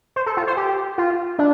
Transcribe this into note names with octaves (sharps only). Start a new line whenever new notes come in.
C5
A4
F4
C5
G4
F4
D4